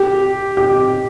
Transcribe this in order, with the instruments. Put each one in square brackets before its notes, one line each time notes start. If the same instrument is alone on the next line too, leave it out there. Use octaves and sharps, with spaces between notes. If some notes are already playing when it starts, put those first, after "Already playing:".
Already playing: [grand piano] G4
G4